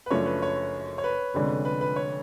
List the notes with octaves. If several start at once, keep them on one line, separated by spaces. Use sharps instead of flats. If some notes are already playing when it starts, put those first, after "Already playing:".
B4
F#1 F#2 F3 A3 D4 C#5
B4
C#5
C#5
B4
F1 F2 D3 G#3 C#4
B4
B4
C#5